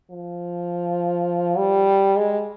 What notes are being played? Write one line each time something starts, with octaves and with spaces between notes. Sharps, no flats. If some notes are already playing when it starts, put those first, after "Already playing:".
F3
G3
G#3